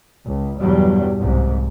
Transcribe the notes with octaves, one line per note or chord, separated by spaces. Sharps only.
C#2
E2 G2 B2 F#3 G3
C2 G#2